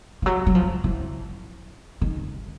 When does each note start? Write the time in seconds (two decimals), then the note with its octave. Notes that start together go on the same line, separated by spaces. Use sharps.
0.22 F3
0.26 F#3
0.47 F#3
0.55 F3
0.84 E3
2.01 D#3